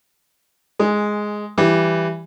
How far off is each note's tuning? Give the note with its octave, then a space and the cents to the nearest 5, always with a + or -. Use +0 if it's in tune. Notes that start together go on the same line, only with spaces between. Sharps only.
G#3 +5 G#5 -10
E3 +10 G3 +0